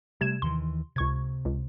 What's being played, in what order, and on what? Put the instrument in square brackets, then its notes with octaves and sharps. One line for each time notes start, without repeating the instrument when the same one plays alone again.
[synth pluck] C3 G#6 E7 [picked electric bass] G3 A3
[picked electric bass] D#2 D#3 E3 [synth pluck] C6
[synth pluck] C#2 C#6 G#6 [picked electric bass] C3
[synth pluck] C#2